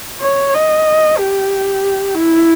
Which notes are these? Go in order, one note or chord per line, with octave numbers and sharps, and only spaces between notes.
C#5
D#5
G4
E4